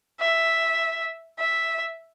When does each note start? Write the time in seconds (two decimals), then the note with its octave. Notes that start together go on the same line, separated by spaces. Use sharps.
0.20 E5
1.39 E5